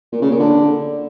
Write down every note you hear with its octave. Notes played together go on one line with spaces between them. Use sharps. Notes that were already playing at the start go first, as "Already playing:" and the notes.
A#2
C#3
A#2
D3